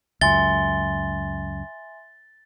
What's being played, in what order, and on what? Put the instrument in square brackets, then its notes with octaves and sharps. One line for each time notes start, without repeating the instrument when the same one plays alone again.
[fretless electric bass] C#2 F#2 [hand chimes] E5 G#5 C6 [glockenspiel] A6 G7